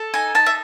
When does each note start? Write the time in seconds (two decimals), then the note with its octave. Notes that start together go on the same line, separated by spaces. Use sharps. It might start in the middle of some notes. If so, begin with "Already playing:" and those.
Already playing: A4
0.14 D#4 G#5
0.35 D#4 A5
0.46 E5